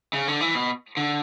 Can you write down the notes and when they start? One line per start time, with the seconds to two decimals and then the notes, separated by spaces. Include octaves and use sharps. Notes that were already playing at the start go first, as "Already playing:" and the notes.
0.13 C#3
0.28 D3
0.41 E3
0.55 B2
0.97 D3